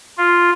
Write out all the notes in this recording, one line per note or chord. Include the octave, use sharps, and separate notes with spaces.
F4